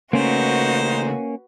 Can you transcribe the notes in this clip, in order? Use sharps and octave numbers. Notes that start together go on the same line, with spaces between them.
C#3 A3 A#3 C#4 D#4 F#4 B4 C5